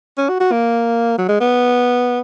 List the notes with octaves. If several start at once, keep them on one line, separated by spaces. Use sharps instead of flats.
C#4
F#4
F#4
A#3
F#3
G#3
B3